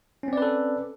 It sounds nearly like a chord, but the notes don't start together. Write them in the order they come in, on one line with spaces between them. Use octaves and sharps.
C#4 C4 D5 B4 A4